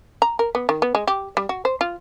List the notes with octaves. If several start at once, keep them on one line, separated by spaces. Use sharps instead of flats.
A#5
A#4
B3
D#3
B3
G#3
G4
G3
F#4
C5
F4